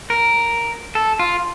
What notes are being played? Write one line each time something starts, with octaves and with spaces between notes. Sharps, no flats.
A#4
A4
F4